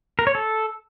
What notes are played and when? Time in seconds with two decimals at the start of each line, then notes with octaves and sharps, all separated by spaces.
0.19 A#4
0.27 C#5
0.35 A4